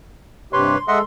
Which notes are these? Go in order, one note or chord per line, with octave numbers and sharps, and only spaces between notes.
G2 C3 G4 B4 C#5 C6
G#3 A4 D#5 E5 F#5 C6